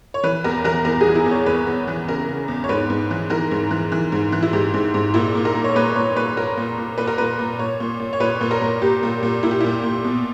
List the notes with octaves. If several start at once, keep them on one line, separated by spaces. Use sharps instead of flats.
C#5
E3 B4
E2 A#4
E3 A#4
E2 A#4
G#4
E3
E4
E2
C#5
E2 B4
E2
E3
C#3 A#4
C#3
E2
C#5
G#2 B4
G#2
E3
E3 A#4
G#2
E3
E3
G#2
E3
E4
G#2 G4
G#2
G#2
A#2 E4
A#2
A#4
A#2
C#5
A#2 B4
A#2 C#5
A#2 B4
A#2 A#4
A#2
A#2
A#2 B4
A#4
A#2 B4
A#2
A#2 C#5
A#2
A#2
C#5
A#2 B4
A#2
A#4
A#2
A#2 G4
A#2
A#2
A#2 E4
G4
A#2 E4
A#2
B2